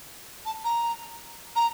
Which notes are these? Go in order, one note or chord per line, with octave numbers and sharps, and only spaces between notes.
A5
A#5
A#5